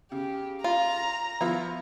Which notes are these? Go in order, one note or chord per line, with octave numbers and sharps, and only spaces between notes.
C#3 G4
F4 A#5
F3 B3 E4 F4